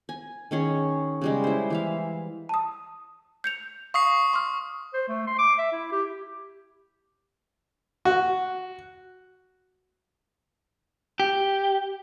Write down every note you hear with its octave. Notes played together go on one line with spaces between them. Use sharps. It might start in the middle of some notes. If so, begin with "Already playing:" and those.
G#5
D#3 C#4 G#4 C#5
C#3 G3 G#3
E4 C5
E3 E5 F5
A5 D#6
G6 C#7 F7
F5 C#6 D#6 C7
C6 D6 F6
C5
A3
C6
D6
E5
E4
G4
F#4
G4